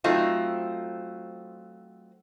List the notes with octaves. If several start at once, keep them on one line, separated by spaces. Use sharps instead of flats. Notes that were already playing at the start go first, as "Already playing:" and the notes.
F#3 A3 C4 D#4 F4